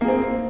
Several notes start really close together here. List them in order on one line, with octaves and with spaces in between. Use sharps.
A#3 G#4 C4